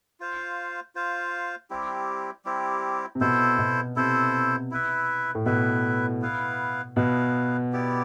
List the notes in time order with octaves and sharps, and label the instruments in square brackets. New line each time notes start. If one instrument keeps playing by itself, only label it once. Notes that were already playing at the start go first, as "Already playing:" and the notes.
[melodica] F4 C5 F5
F4 C5 F5
G3 C4 E4 G4
G3 C4 E4 G4
[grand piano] C3
[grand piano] B2 [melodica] E4 A4 C5
[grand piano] B2
[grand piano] C3 [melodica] E4 A4 C5
[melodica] E4 B4 E5
[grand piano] A2
[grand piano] B2 [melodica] E4 B4 E5
[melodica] B3 E4 B4 F5
[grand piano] B2 [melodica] B3 E4 B4 F5
[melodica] B3 E4 G4 D5